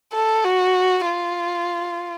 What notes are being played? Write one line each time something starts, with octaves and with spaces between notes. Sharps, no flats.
A4
F#4
F4